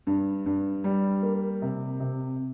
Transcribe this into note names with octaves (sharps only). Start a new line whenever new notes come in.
G2
G2
G3
A#3
C3
C3